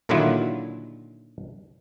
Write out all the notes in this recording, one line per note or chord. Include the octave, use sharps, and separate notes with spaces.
A#2 D3 D#3 F#3 E4 F4